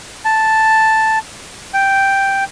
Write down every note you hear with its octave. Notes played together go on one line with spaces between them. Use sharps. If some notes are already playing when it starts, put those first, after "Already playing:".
A5
G5